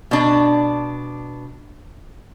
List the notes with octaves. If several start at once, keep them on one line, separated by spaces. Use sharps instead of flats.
B2 D4